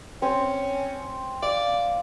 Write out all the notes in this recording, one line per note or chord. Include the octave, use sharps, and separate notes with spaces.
C4 C#4
D5 F5